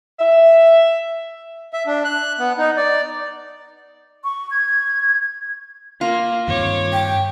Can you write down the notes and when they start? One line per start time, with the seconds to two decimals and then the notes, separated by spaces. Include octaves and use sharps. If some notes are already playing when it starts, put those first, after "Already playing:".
0.20 E5
1.73 E5
1.87 D4
2.05 F#6
2.39 B3
2.58 D#4
2.77 D5
4.24 C#6
4.50 G#6
6.01 A#3 F4
6.48 G2 D#3 C4 C#5 D6
6.93 G5